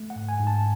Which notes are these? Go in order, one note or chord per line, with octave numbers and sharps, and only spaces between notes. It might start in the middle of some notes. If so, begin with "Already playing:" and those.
Already playing: A3
F#5
G#2
G#5
G#2
A5